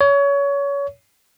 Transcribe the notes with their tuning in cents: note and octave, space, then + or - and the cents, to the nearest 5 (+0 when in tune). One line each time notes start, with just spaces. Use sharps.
C#5 +25